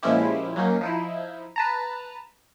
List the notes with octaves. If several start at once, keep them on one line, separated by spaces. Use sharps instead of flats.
A#2 F3 G#3 C#4 E4 G4
F#3 A#3 C#4 D#4
F3 D#4 E4
B4 A5 A#5